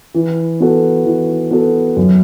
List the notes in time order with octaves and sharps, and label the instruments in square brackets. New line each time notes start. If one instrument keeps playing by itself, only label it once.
[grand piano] E3
B3 F#4 A4
E3
B3 F#4 A4
F#2